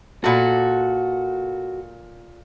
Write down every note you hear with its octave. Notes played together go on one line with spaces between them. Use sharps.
A#2 F#4 A4